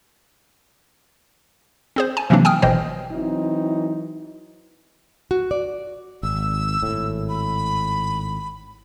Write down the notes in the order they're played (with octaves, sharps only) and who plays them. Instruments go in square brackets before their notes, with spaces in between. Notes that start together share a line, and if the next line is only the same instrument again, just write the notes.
[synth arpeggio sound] C4 G#4 C5
G#5 A5
C3 E3 F#3 A#3 C4 D4
G5 G#5 D#6 F6
G1 B2 E3 C5 D#5 G5
[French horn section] E3 F#3 C4 D#4 E4
[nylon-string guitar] F#4
D5
[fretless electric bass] G#1 [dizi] E6
[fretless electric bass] G#1 A2
[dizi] B5